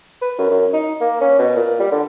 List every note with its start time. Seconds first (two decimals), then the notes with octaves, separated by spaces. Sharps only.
0.21 B4
0.38 F#2
0.50 F#2
0.73 D#4
1.01 A#3
1.21 C#4
1.39 B2
1.56 A#2
1.80 G3
1.92 D3